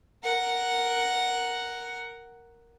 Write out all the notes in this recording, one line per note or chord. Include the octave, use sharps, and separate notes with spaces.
A#4 F#5